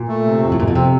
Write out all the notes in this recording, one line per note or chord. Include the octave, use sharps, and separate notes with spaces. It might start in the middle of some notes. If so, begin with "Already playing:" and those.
Already playing: A#2
A3
C3
F2
A2
F2 A#2
B2
C3 C4